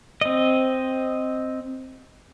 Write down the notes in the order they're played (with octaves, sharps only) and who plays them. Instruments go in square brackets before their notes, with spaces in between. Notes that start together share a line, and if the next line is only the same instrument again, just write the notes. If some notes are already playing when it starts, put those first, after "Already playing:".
[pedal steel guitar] C4 D#5